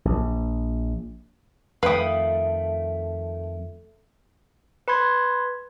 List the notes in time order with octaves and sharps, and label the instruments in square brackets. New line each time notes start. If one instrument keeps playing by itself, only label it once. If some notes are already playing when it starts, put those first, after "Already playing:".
[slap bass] A#1
[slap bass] F2 D#3 [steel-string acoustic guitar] A3 [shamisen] B4 G5 [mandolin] F5 B5 D#6
[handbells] B4 B5 C6 G#6